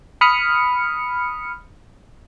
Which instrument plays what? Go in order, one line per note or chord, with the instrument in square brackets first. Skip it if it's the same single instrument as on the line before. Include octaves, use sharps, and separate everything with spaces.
[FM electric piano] B5 D#6 F6 C#7